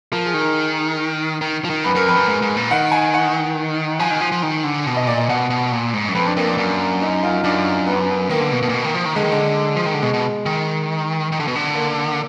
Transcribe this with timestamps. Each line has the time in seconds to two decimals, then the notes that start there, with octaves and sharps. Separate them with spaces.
0.12 F3 A#4
0.26 G#4
0.34 D#3
0.40 A#4
1.41 D#3
1.64 F3
1.70 D#3
1.84 F#2 B4
1.95 F#2 A#4
2.06 F2 B4
2.17 F#2
2.28 G#2
2.42 G#2
2.57 A#2
2.71 D#3 F#5
2.92 G#5
3.14 F#5
3.99 F3 G#5
4.11 D#3
4.21 F3
4.32 F3
4.43 D#3
4.64 D3
4.86 B2
4.96 D#5
5.07 A#2 D5
5.18 D#5
5.29 B2 F#5
5.50 B2
5.72 A#2
5.94 G#2
6.08 F#2
6.15 F2 B4
6.26 D4
6.36 F2 A#3
6.47 D4
6.58 F#2
7.01 D#4
7.23 F4
7.43 F#2 D4
7.87 B3
8.30 D#3 A#3
8.40 D3
8.52 B2
8.62 B2
8.69 A#2
8.74 B2
8.84 D#3
8.94 F3
9.05 D#3
9.16 D3 G#3
9.24 D#3
9.32 D3 G#3
9.76 F3
9.86 D#3
9.94 D3
10.02 B2 G#3
10.14 B2
10.46 D#3
11.32 D#3
11.40 D3
11.48 B2
11.56 D3
11.75 A#3